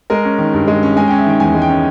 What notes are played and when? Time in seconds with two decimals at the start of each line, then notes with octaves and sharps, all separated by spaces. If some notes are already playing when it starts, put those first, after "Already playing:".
0.10 G#3 A#4
0.25 C#4
0.38 D#3
0.53 G2
0.68 G#3
0.83 C#4
0.96 G#3 G#5
1.08 C#4 G5
1.19 E5
1.26 D#3 G5
1.40 E2 G#5
1.55 G#3
1.62 G5
1.69 C#4